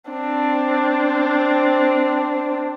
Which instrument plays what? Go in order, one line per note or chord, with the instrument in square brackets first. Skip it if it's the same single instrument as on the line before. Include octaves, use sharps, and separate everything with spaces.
[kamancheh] C4 D4